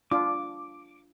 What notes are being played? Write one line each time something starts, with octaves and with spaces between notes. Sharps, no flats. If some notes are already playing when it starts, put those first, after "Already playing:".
D4 F4 D6